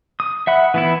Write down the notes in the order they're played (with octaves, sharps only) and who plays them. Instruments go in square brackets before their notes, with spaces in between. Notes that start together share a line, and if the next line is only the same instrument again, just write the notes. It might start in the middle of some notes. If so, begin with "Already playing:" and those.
[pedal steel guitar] D#6
E5 F#5 B5
E3 B3 E4